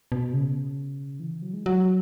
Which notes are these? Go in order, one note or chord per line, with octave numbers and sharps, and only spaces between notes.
B2
C#3
E3
F#3
G#3
F#3